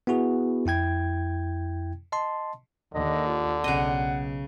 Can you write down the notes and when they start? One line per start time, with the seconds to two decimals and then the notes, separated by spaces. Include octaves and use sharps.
0.07 B3 E4 F#4 G#4
0.66 F2 E4 G5 G#6
2.12 D#5 A5 C6
2.94 D#2 D3 D#5
3.27 F4
3.64 B1 C#3 D#5 F#5